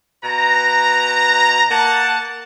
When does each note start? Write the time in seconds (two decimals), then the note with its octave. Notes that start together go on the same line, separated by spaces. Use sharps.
0.24 B2 B4 A#5
1.71 A#3 F#5 A5